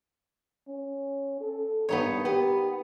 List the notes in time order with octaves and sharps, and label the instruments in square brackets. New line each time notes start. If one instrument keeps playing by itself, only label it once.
[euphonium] C#4
A4
[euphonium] G2 [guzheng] B3 D#4 C#5
[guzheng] B3 [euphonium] G4